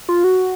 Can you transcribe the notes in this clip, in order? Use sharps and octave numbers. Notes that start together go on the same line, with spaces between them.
F4
F#4